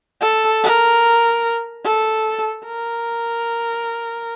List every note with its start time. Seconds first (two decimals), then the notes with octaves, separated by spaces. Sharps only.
0.21 A4
0.63 A#4
1.85 A4
2.67 A#4